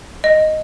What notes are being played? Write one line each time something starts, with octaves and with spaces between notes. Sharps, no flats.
D#5